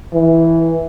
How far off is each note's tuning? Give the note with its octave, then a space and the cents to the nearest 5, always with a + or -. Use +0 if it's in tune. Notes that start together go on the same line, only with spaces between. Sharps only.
E3 -5